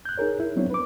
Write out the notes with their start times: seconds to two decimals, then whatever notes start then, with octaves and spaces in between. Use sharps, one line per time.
0.05 F#6 G6
0.17 D#4 G#4 A#4 C#5
0.40 E4
0.56 F#3 B3 C4 D4 C#5
0.70 B4 D6